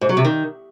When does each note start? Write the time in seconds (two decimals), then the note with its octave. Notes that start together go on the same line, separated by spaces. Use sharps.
0.01 G#2
0.09 F#3
0.17 C3
0.25 D#3